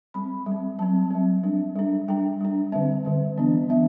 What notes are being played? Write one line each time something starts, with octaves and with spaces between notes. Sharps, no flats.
G3 C4 B5
G3 C4
F#3 C4 A5
F#3 C4
G3 D4
G3 D4
G3 D4 G5
G3 D4
D3 G3 C4 E5
D3 G3 C4
E3 B3 D4
E3 B3 D4 E5